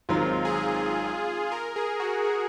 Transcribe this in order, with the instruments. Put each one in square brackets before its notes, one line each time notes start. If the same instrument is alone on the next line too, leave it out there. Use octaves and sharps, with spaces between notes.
[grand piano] G#1 G#2 D#3 F#3 C4 [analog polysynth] F4
[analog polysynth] G#4
A#4
G#4
F#4
G#4